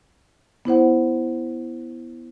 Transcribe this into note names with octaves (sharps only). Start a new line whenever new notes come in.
B3 E4 C5 F#5